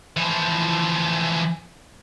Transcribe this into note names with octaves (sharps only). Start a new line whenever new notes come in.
E3 F3